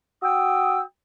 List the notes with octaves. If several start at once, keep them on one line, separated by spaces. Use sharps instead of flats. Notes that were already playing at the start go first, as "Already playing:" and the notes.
F#4 G5 D#6 E6